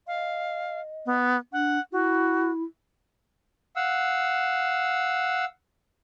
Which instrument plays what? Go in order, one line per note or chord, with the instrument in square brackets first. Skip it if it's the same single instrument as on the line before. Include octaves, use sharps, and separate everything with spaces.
[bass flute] D#5 [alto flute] F5
[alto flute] B3
[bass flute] D4 [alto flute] F#5
[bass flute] E4 [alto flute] F#4
[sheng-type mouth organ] F5 F#5 E6